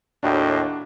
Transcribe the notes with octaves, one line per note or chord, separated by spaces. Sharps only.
D#2 A2 D4 F#4